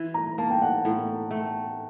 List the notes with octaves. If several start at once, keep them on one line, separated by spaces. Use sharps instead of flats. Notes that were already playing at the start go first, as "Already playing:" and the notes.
Already playing: E3
A#5
A#3 A5
G5
F#5
A2
A3